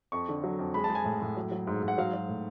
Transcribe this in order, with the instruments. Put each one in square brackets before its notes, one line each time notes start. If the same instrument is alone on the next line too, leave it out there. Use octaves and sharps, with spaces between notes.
[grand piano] F2 C#6
D3
F#3
F2
G#3 B5
A5
G#3
G#5
A2
A2
F#3
F#3
G#2
G#2
F#5
F#3 F5
F#3
A2